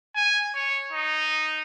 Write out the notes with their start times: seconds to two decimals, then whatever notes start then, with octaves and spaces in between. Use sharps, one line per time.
0.15 G#5
0.55 C#5
0.92 D#4